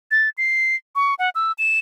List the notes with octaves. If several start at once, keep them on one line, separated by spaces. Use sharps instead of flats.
A6
C7
C#6
F#5
E6
E7